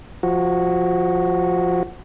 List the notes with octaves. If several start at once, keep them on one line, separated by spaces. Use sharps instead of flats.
F3 F#4